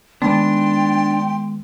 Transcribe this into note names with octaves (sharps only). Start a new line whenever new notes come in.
D#3 G#3 B3 D4 G5 C6